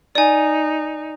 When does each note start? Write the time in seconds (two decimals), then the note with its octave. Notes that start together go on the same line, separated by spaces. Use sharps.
0.15 D#4 D5 G#5